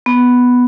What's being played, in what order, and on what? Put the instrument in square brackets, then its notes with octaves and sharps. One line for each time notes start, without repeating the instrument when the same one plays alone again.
[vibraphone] B3